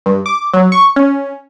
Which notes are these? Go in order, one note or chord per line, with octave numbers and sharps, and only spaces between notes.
G2
D6
F#3
C#6
C#4